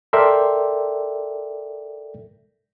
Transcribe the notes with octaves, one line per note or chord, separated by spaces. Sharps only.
A4 A#4 D5 E5 G5 C6